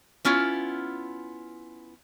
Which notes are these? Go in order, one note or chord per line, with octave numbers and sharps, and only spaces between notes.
B3 C#4 E4 F4